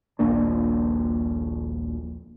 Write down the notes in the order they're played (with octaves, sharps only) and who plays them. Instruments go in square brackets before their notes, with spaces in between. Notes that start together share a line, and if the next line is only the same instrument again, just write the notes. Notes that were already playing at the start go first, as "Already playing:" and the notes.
[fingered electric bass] D#1 A#1 A#3 D4